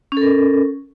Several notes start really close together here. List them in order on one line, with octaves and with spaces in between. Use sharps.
C#4 A4 A#4